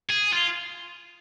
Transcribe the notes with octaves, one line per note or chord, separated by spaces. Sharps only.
G#4
F4